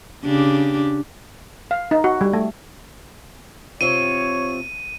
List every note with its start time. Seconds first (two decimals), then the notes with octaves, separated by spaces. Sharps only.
0.24 C#3 D4 G4
1.71 F5
1.91 D#4
2.04 F#4
2.21 G3
2.33 A3
3.81 C3 C4 F4 C#5 D#7